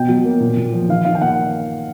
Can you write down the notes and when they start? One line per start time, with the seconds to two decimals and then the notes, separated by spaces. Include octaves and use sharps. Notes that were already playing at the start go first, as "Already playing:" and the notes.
Already playing: B2 G5
0.09 F#3
0.25 A#3
0.40 A#2
0.57 A#2
0.73 F3
0.89 D#3 F5
1.05 D#3 F5
1.15 G5
1.21 A#3 F#5